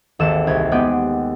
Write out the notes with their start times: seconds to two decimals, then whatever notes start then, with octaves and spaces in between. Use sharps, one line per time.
0.19 G#1 D#2 A4 E7
0.47 C2 G#6
0.71 G#3 B3 G4